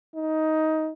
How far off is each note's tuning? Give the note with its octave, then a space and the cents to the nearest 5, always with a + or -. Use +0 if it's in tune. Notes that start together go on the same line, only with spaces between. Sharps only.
D#4 +15